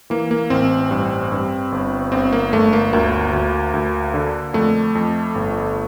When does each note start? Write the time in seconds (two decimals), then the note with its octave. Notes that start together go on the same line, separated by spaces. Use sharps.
0.10 E3 A#3
0.31 A#3
0.50 A1 C4
0.91 G2
1.32 G2
1.72 G1
2.12 G1 C4
2.33 A#3
2.53 G1 A3
2.73 A#3
2.93 D2 A#3
3.33 D2
3.74 D2
4.14 D3
4.54 F2 A3
4.95 F2
5.35 G1